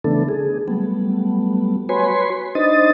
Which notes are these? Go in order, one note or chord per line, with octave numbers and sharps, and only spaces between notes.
C#3 E3 A3 B3 D4 A4
G#4
F#3 G3 A3 B3
F#4 B4 C#5 G#5 B5 C6
D4 D#4 C5 D#5 D#6 A6